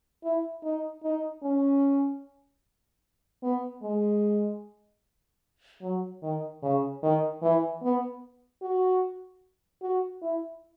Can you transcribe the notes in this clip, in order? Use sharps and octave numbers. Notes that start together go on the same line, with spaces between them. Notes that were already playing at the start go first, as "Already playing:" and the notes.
E4
D#4
D#4
C#4
B3
G#3
F#3
D#3
C#3
D#3
E3
B3
F#4
F#4
E4